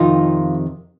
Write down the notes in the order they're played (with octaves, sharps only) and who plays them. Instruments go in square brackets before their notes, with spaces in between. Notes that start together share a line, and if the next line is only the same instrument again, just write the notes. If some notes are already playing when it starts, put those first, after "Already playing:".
Already playing: [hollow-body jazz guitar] F2 C3 D#3 D#4 F4